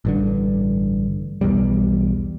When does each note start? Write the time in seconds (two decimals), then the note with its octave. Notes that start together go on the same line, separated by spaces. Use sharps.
0.05 A1 G2 D3
1.41 B1 E2 B2 G3